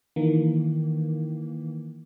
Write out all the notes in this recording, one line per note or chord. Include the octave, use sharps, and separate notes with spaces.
D#3 E3 A#3